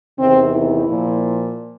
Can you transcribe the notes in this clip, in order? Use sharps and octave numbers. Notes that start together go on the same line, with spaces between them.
E2 C3 D#3 C4
E4
A#2 F3